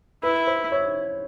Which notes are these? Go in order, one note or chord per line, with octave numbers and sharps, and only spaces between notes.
E4 B4
C5
C#5